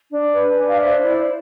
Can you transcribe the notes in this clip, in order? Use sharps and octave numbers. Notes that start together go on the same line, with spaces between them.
D4
B4
D4 G#5
F5
C5 E5
E4 D5